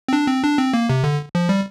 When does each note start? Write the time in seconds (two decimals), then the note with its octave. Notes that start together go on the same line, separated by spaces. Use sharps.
0.08 C4
0.13 D4
0.28 C4
0.44 D4
0.58 C4
0.74 A#3
0.90 C3
1.04 D3
1.35 F3
1.49 G3